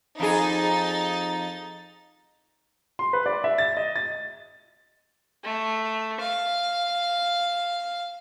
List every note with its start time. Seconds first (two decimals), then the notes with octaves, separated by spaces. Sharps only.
0.20 F2 D#4 G#4 A6
2.99 C6
3.13 B4
3.26 D5
3.44 E5
3.58 A6
3.77 D#5
3.96 A6
5.44 A3
6.20 F5